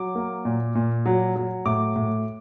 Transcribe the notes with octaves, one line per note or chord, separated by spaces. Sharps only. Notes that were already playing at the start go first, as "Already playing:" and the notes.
Already playing: F#3 D6
A#3
A#2
A#2
F#3
F#3
A2 D6
A2